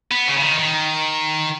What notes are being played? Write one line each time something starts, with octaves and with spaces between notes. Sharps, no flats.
B3
C#3
C#3
D#3
D#3